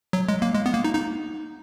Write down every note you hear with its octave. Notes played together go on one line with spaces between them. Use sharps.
F#3
G#3
A#3
G#3
B3
A#3
D#4
D#4